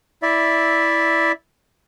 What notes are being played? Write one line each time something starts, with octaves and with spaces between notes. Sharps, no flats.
E4 D5 E5